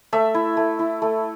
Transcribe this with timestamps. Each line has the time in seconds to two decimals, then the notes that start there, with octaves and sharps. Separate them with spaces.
0.13 A3 E5
0.34 E4
0.57 A3
0.79 E4
1.02 A3